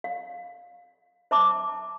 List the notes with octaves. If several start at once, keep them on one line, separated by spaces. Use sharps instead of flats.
F5
C5 E5 A5 A#5 D6